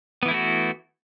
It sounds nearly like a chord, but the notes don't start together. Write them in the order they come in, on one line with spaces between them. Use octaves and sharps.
B3 E3 E4 A3 F#4